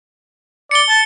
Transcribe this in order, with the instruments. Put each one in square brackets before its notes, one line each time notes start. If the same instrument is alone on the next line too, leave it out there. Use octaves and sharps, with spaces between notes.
[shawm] D5 [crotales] C#7 G7
[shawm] A5